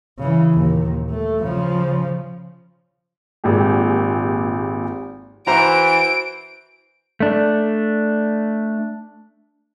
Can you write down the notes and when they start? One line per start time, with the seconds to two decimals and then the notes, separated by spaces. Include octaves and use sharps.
0.19 C#3 E3
0.54 D#2 A#2
1.10 A3
1.43 C#3 F3
3.44 G#1 A#2 G4 G#4
5.47 E3 F#4 C5 A#5 D7
7.20 A3 D4